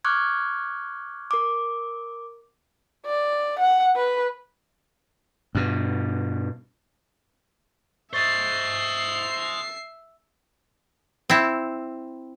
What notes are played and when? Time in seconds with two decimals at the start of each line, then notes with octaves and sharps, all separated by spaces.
0.05 C#6 D6 F6 F#6 G#6
1.31 A#4 D6
3.06 D5
3.60 F#5
3.96 B4
5.55 G2 B2
8.13 C5 D#5 E5 C#6 A6 C7
11.30 C4 E4